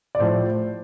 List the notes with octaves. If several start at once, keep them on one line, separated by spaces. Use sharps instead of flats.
D5
A2 F3 A3 C5